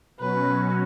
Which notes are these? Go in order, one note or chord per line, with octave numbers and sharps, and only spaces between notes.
B2 F#3 C#4 F#4 B4